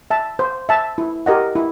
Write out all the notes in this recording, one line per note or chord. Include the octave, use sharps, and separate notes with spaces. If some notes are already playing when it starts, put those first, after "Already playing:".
E5 A5
C5
E5 A5
E4
G4 A#4 D#5 F#5
E4